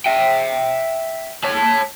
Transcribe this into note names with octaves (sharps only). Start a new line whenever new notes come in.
E5 G5
C#5 A5